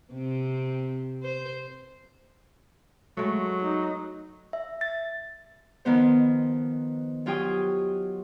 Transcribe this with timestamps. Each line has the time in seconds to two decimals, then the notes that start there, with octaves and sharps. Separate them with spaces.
0.13 C3 C4
1.23 C5
3.17 F#3 G#3 A3
3.62 D#4
4.53 E5
4.81 A6
5.85 D#3 F3 B3 C5
7.26 F#3 F4 G4 G5 G#5 D#6